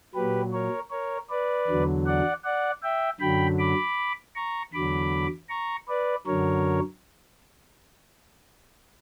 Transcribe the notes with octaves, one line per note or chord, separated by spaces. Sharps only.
A#2 F#3 G4 B4
A#4 C#5
A#4 C#5
B4 D5
E2 D3 F#3
D5 F#5
D5 F#5
E5 G5
F#2 D3 F#3 G5 B5
B5 D6
A#5 C#6
E2 D3 F#3 B5 D6
A#5 C#6
B4 D5
F#2 D3 F#3 A#4 C#5